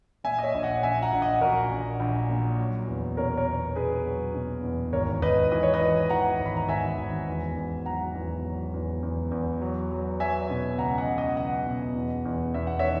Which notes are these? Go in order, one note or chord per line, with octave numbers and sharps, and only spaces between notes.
A#2 E5 G#5
D#5
C#5 E5
A#1
D#5 F#5
A#1 E5 G#5
F#5 A#5
A#1
D#5 F#5
A#1 F#4 A#4
A#1
A#1
A#2
F#3
E2
B2 A#4 C#5
A#4 C#5
E2
B2 G#4 B4
F#3
B2
E2
G#1 A#4 C#5
G#1 B4 D#5
E3 D#5
C#5
B4 D#5
E3
E3 F#5 A#5
G#1
B5
A#5
G#1 E5 G#5
G#1
E2
E2
F#3 F#5 A#5
E2
F#3
E2
E2
E2
F#3
F#3
F#3 E5 G#5
B2
C#2 F#5 A#5
D#5 F#5
C#2
D#5 F#5
F#3 D#5 F#5
B2
E2
E2
E2 E5
F#5
D#3 C#5 E5